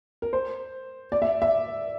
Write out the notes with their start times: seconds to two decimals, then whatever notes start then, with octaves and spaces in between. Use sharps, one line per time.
0.22 A#4
0.33 C5
1.12 D5
1.22 E5
1.42 E5